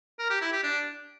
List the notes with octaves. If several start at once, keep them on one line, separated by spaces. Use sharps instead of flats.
A#4
G4
E4
G4
D4